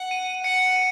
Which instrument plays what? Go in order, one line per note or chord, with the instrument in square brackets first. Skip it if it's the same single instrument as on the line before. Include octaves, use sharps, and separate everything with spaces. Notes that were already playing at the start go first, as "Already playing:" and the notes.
Already playing: [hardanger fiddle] F#5
[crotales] D#7
[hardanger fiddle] F#5 [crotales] C#7
[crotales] D#7